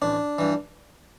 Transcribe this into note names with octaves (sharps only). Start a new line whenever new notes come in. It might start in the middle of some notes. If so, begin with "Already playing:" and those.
A1 D4
G2 E3